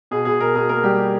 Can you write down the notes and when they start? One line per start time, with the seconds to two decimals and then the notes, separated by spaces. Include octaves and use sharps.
0.11 B2 G#4
0.25 B2 G#4
0.40 B2 A#4
0.55 B2 G#4
0.69 A#3 A#4
0.84 G3 G4